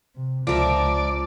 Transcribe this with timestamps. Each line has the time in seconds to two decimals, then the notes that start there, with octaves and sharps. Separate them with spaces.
0.16 C3
0.47 C#2 F3 A#4 D5 E5